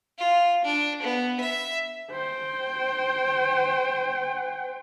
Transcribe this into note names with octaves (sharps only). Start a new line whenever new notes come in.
F4
D4
B3
E5
C5 G5